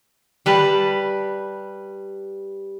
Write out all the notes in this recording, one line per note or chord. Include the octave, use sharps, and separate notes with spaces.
G3 B4 A5